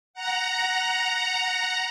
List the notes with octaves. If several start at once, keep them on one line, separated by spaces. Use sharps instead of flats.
F#5 A#5